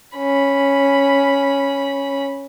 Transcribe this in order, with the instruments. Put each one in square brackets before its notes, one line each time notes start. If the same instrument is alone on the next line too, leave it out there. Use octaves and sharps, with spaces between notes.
[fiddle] C#4 B5